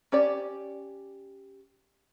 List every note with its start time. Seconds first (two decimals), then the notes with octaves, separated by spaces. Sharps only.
0.12 C#4 G4 D5